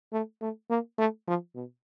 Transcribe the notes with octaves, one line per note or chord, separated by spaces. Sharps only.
A3
A3
A#3
A3
F3
B2